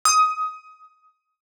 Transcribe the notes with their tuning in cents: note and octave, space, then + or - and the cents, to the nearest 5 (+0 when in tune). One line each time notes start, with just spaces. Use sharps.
D#6 +20